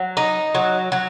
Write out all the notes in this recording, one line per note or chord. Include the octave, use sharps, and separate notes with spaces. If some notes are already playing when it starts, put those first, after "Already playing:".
Already playing: F#3
D#4
F#3
F#3